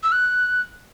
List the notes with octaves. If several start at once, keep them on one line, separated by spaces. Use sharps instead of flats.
E6
F#6